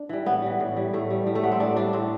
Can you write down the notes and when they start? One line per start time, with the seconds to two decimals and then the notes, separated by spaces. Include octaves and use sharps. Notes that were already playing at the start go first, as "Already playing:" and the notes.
Already playing: D4
0.09 E3 G3
0.26 A2 B3
0.42 E3 G3
0.60 A2
0.76 E3 G3
0.93 A2 A3
1.10 G3
1.26 A2 G3
1.35 A3
1.43 G3 B3
1.52 C4
1.60 A2 D4
1.76 G3 D4
1.93 A2 C4